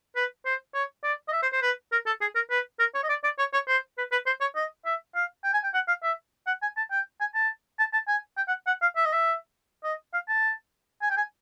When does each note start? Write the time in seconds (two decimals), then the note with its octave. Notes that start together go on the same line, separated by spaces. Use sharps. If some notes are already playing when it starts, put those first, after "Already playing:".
0.16 B4
0.46 C5
0.74 C#5
1.03 D5
1.29 D#5
1.33 E5
1.43 C5
1.53 C5
1.62 B4
1.92 A#4
2.06 A4
2.21 G#4
2.35 A#4
2.50 B4
2.80 A#4
2.95 C#5
3.03 D#5
3.09 D5
3.24 D5
3.39 C#5
3.54 C#5
3.68 C5
3.98 B4
4.12 B4
4.27 C5
4.41 C#5
4.56 D#5
4.86 E5
5.16 F5
5.44 G5
5.54 G#5
5.64 G5
5.74 F#5
5.88 F5
6.03 E5
6.47 F#5
6.62 G#5
6.77 A5
6.91 G5
7.21 G#5
7.35 A5
7.79 A5
7.93 A5
8.08 G#5
8.37 G5
8.48 F#5
8.67 F#5
8.82 F5
8.97 E5
9.05 D#5
9.13 E5
9.84 D#5
10.14 F5
10.29 A5
11.02 G#5
11.10 G5
11.17 G#5